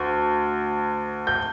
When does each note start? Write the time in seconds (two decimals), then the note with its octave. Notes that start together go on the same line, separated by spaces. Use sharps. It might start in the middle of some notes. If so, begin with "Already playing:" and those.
Already playing: D2
1.27 G6